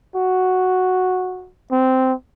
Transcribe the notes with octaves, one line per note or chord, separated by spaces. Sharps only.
F#4
C4